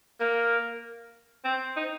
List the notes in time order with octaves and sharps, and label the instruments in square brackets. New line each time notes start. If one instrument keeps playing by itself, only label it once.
[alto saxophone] A#3 [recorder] A#4
[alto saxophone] C4 [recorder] C5
[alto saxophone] D#4